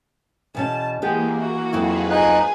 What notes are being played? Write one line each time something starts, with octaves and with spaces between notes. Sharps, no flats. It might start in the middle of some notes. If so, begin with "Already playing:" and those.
E2 B2 C#4 A5
E3 G#3 A#3 B3 G4
F#4
F2 F#3 E4 F4 G#4 B4
D#4 G#5 F#6